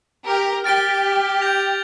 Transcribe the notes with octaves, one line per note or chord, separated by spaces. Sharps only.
G4 A#4
G4 F6 A6 D7 G7
G6 A#6 F7